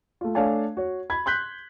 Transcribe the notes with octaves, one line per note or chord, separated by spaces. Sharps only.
A3 F4
A3 D4 C#5 F5 G#5 A5
F#4 C#5
B5 G#6
C6 F#6 G6 B6